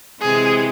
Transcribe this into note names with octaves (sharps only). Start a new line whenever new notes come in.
C3 E3 G#3 C4 G#4